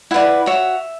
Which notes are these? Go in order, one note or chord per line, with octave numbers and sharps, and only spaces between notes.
E4 B4 D5 F#5
F#4 C#5 E5